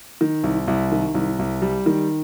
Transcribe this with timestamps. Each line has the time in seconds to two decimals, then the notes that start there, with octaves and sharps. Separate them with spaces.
0.21 D#3
0.44 C2
0.68 C2
0.92 D#3
1.15 C2
1.39 C2
1.62 G3
1.86 D#3